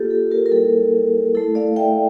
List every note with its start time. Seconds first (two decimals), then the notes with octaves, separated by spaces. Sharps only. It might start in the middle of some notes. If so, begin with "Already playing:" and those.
Already playing: A#3 D4 F4 G4 A4
0.11 A4
0.31 G4 A#4
0.46 A#4
0.51 G3 A#3 E4 A4
1.35 A3 E4 A4
1.55 D5 F5
1.76 E5 G5